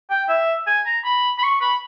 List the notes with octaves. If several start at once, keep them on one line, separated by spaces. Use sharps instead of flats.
G5
E5
G#5
A#5
B5
B5
C#6
B5